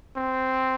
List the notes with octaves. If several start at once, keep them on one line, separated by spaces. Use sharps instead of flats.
C4